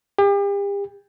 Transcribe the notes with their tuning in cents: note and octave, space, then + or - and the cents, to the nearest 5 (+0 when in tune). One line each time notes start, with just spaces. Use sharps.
G4 +40